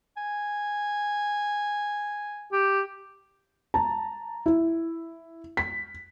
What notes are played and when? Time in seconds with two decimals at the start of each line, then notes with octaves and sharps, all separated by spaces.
0.17 G#5
2.52 G4
3.74 A5 A#5
4.46 E4
5.57 B6